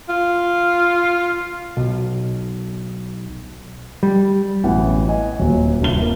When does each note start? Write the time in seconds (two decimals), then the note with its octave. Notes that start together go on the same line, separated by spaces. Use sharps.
0.09 F4
1.77 B1
4.03 G3
4.64 A1 F#2 B2 E3 F#5
5.08 D#5 G#5
5.39 D#1 A#2 F#3
5.80 D#1 C2 G2 G7
6.01 A#3